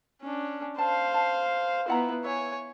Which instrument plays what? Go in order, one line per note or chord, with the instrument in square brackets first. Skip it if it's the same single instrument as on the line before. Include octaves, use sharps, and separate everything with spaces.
[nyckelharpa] C#4 D4
[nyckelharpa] C5 F5 [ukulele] A5
[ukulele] A5
[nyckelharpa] B3 E4 [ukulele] F4 F#5 A#5
[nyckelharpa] C#5 G#5 [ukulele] E5